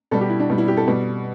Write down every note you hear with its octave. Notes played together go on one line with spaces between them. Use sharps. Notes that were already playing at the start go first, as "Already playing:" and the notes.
B2 G3 A4
G4
E4
D4
B2 G3
E4
G4
A4
B2 G3